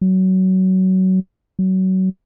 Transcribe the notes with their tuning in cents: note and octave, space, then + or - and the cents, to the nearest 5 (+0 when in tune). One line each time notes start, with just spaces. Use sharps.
F#3 +20
F#3 +25